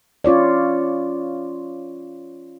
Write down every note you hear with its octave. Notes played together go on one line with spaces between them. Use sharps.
C#4 F4 C#5 D5